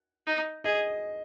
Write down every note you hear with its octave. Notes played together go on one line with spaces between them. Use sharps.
D#4
G#4 D#5